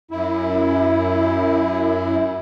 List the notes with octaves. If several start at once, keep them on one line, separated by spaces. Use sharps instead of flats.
F#2 E4